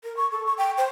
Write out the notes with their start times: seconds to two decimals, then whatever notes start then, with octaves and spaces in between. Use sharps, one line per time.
0.04 A#4
0.17 C#6
0.32 A4
0.46 C#6
0.58 G5
0.78 C5